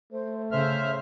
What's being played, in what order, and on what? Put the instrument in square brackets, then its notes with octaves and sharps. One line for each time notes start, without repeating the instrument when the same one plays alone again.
[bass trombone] A3 [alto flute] C5
[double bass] C#3 [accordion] C5 E5 F6 [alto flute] C6